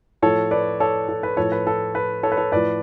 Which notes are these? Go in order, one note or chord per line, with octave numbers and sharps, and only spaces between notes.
A2 F3 A4 C#5
B4 D5
A4 C#5
A4
B4
A2 F3 A4 C#5
B4
A4
B4
A4 C#5
B4
A4 C#5
A2 F3 B4 D5